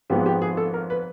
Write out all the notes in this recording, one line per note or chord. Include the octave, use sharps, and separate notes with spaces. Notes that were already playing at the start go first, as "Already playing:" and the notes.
G#1 G#2 F3 G#3 B3 G4
G4
G#4
A4
A#4
B4